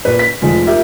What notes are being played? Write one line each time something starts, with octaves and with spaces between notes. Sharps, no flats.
A#2 B4
B6
F1 F3 G#3
F4 G4 A#4 E5